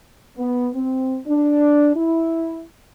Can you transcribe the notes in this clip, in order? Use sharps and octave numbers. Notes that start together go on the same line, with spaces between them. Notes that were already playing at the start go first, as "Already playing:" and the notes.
B3
C4
D4
E4